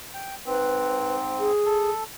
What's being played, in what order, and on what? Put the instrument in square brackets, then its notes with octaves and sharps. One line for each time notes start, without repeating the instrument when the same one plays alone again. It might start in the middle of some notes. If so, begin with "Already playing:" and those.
[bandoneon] G5
[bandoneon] G#2 C4 [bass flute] B4
[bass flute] G#4
[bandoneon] A4